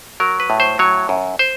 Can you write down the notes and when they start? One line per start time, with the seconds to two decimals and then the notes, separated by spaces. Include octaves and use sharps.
0.20 F#3 A#4
0.40 B4
0.50 A2
0.60 C5
0.79 F#3 C#5
1.09 F#2
1.39 C5